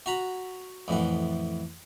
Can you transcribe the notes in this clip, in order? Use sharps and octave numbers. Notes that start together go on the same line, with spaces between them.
F#4 F#5 A#5 B5
F2 A2 E3 F#5